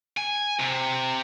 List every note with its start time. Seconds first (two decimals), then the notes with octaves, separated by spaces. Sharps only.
0.17 G#5
0.59 C3